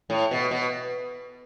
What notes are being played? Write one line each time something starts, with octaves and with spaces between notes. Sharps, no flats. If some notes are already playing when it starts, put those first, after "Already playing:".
A2
B2
B2